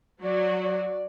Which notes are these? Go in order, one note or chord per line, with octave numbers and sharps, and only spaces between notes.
F#3 F#4 D5
D5